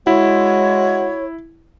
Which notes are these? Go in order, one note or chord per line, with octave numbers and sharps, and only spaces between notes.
G#3 E4 F#4 C#5